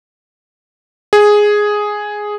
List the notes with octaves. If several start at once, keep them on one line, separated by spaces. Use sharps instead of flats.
G#4